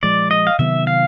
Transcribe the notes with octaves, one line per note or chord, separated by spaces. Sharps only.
A#2 F3 G#3 D5
D#5
F5
C3 D#3 F#3 B3 E5
F5